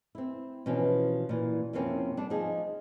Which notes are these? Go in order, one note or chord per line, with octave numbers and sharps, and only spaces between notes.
C4 E4
B2 E3 F3 C#4
A#2 E3
F2 C3 A#3 C4 C#4 E4
G3 D4
F3 D#4 G#4